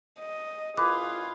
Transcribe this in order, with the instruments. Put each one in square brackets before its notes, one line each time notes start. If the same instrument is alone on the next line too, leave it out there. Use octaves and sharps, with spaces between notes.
[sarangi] D#5
[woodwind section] F#2 E4 G#4 [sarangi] F4 [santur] B4 [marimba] D6